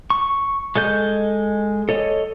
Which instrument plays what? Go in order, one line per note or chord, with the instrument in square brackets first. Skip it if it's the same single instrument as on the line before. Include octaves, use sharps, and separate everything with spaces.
[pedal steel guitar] C#6
G#3 A4 D#5 G6
A4 C#5 D#5